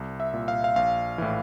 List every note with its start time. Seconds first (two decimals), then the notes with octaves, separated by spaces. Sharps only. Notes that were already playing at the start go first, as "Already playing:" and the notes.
Already playing: C2
0.20 E5
0.34 A#2
0.48 F5
0.64 F5
0.76 A#1 F5
1.18 A2 E3